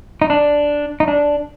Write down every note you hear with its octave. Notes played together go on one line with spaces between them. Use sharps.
D#4
D4
D#4
D4